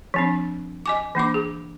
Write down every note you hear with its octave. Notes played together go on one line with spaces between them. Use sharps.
F3 C4 D4
D#5 G#5 D6
E3 A#3 D4 D6
G#4